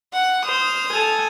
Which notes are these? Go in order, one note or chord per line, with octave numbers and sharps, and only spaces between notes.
F#5
C5 D#6 F6
A4 G#5